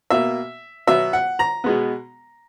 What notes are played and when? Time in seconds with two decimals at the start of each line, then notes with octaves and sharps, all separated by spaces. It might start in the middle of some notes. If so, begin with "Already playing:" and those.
0.10 B2 A#3 E5
0.87 B2 F#3 B3 E5
1.13 F#5
1.39 A#5
1.64 B2 G#3 B3